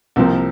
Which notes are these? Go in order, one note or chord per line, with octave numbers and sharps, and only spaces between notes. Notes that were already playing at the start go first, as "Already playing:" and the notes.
C2 C3 F3 A#3 C4